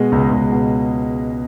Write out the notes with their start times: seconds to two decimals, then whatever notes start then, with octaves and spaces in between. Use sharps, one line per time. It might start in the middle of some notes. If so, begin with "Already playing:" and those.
Already playing: B2 G#3 D#5
0.12 C#2
0.33 C#2
0.52 B2